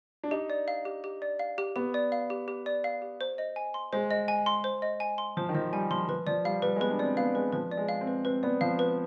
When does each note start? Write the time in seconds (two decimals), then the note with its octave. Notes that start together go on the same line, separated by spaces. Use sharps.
0.23 D4
0.31 D#4 G4
0.50 D5
0.68 F5
0.85 G4
1.04 G4
1.22 D5
1.39 F5
1.58 G4
1.76 B3 G4
1.94 D5
2.12 F5
2.30 G4
2.48 G4
2.66 D5
2.84 F5
3.02 G4
3.21 C5
3.38 D#5
3.56 G#5
3.74 C6
3.93 G#3 C5
4.11 D#5
4.28 G#5
4.46 C6
4.64 C5
4.82 D#5
5.00 G#5
5.18 C6
5.37 F3 C5
5.49 D#3
5.54 F3 D#5
5.73 G3 G#5
5.91 F3 C6
6.08 F3 B4
6.27 F3 D5
6.45 G3 F5
6.62 G3 B4
6.76 G#3
6.81 B3 B4
6.91 D4
6.99 C4 D5
7.17 B3 F5
7.35 G#3 B4
7.53 F3 B4
7.71 D5
7.77 G#3
7.89 F5
8.01 C4
8.07 B4
8.25 C4 B4
8.43 B3 D5
8.61 F3 F5
8.79 B4